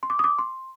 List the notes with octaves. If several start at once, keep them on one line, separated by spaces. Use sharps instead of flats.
C6
D6
D#6
D6
C6